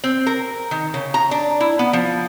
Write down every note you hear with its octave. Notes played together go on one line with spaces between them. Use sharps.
C4
A#4
D#3
C#3
A#5
D4
E4
B3
F3